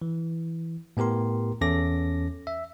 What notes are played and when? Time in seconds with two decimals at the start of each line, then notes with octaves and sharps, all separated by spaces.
0.02 E3
0.97 A2 B3 G4 A#4 C6
1.61 E2 C#4 A4 D6 A#6
2.47 E5